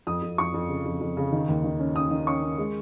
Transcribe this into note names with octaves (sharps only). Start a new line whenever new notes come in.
F2 D#6
F2
F2 C#6
F2
C#3
F2
F2
C#3
D#3
D#2
D#3
C#4
C#4 D#6
D#3
C#4 C#6
C#4
G#3